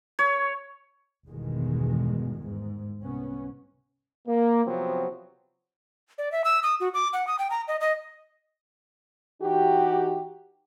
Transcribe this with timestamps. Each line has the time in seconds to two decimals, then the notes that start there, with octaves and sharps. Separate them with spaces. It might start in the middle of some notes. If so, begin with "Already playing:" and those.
0.19 C#5
1.27 G1 E2 B2 D#3 G#3
2.47 G#2
3.01 C2 B3 C#4
4.27 A#3
4.65 C3 F3 F#3 B3 C4
6.18 D5
6.32 E5
6.44 E6
6.63 D#6
6.80 F#4
6.94 D6
7.13 F#5
7.27 D#6
7.39 G5
7.51 A#5
7.68 D#5
7.81 D#5
9.42 E3 D#4 F#4 G4